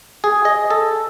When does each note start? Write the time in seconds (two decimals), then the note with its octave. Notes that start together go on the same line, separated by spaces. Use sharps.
0.24 G#4
0.45 D#5
0.70 A4